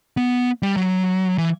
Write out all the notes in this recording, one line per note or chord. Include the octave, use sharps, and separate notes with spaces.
B3
G3
F#3
E3